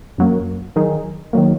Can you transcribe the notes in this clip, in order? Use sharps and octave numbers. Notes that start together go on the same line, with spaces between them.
F#2 F#3 A#3
D#3 F#3 D#4 G#4
D#3 F#3 A#3